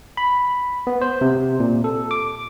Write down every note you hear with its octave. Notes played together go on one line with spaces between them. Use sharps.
B5
B3
C5
C3
A#2
A4
D6